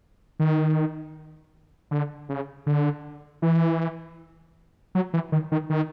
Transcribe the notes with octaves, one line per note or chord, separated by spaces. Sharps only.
D#3
D3
C#3
D3
E3
F#3
E3
D#3
D#3
D#3